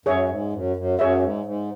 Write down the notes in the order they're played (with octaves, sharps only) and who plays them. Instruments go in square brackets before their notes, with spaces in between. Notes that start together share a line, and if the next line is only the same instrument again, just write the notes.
[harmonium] F#2 [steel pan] G#4 C#5 E5
[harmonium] G#2
F#2
F#2
[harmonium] F#2 [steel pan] G#4 C#5 E5
[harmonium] G#2
G#2